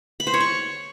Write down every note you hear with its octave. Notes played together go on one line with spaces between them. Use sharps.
B5
C5
C#5
C#6